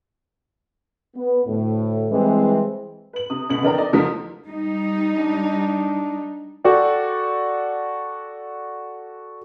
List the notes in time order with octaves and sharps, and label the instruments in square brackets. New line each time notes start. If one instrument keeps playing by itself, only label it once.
[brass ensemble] B3
D2 A2
E3 G3 G#3 C4
[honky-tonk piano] B4 F#7
C3 D#6
C#2 B2 F#7
F1 E3 D4 A#4 G5 A#5
D#4 D5
F2 F3 F#4 A#4 D#6 B6
[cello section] G3 D#4
[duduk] D4
[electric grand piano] F#4 A4 D5 G5